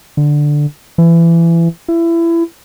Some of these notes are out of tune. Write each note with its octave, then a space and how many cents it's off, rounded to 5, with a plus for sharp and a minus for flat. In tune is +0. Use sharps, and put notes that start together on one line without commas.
D3 +5
E3 +25
E4 +25